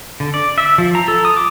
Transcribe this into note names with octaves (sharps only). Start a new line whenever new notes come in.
D3
D5
E5
F3
A#5
A4
D#6
D6